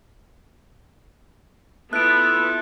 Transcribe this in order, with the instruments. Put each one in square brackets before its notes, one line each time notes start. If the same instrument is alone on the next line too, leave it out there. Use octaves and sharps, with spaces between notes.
[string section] B3 [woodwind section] E4 F4 A4 [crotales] F#6 D7